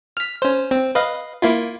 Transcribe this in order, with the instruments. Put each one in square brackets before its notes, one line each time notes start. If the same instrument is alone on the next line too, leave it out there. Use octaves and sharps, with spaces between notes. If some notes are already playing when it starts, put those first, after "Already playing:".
[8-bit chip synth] F6 B6
C#4 C5
C4
B4 D#5 F5
A#3 E4 F4